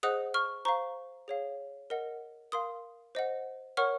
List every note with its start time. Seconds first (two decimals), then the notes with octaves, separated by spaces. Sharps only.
0.03 G#4 C5 D#5 F#5 D#6 F#6
0.34 C#6 F6
0.65 C5 F5 A#5 C#6
1.28 G#4 C#5 F5
1.90 A#4 D#5 F#5
2.52 A#4 F5 C6 D#6
3.15 C5 D#5 F#5
3.77 A#4 C#5 F#5 C#6 F6